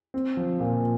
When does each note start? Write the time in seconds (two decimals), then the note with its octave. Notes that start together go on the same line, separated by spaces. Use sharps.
0.14 C4
0.37 F3
0.60 A#2